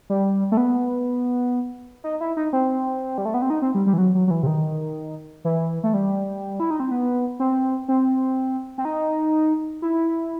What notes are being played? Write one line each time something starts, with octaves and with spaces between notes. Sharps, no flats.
G3
A3
B3
D#4
E4
D#4
C4
G3
A3
B3
C4
D#4
C4
G3
G3
E3
F#3
F#3
F#3
E3
C3
D#3
E3
A3
G3
E4
D#4
C4
B3
C4
C4
C4
D#4
E4